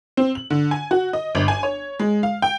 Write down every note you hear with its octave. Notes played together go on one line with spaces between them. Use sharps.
C4
F#7
D3
G#5
F#4
D#5
G1
G#5
C#5
G#3
F5
G5